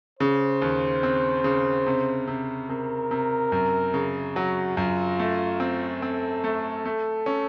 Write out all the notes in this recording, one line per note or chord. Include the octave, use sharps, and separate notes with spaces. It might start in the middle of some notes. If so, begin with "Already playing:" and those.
C#3 C5
D#2
C4
C#3
C3
C3
C3 A#4
C3
F#2
C#3
F#3 F#4
F#2 F4
A3
C4
C4 A4
A3
A3
C#4